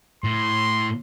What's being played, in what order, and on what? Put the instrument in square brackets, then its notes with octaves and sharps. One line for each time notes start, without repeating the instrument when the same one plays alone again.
[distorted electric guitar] A2 [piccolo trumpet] C6